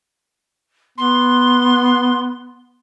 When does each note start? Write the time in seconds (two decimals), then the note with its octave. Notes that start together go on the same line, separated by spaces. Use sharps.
0.98 B3 C6